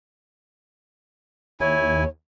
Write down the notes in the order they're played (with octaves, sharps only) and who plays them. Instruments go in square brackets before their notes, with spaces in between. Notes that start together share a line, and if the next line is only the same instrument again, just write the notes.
[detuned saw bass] D#2 [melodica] E4 G#5 [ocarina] C#5